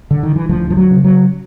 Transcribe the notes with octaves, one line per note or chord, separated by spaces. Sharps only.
D3
D#3
E3
D2 F3
F3
F#3
C#3
F#3